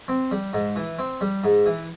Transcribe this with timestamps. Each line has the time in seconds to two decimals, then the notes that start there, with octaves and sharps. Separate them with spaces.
0.08 C4
0.31 G3
0.53 G#2
0.76 E3
0.99 C4
1.21 G3
1.44 G#2
1.66 E3